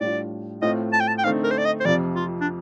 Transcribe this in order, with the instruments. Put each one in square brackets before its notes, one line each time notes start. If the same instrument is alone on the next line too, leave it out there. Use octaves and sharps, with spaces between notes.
[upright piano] A2 G3 D4 F4 [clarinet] D5
[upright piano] A2 A3 C4 F4 [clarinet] D#5
[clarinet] A5
G5
A5
G5
[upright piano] D3 A3 C4 D#4 [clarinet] F5
[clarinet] A#4
C5
D5
D#5
C5
[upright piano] F2 C3 F3 [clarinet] D5
[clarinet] F4
D4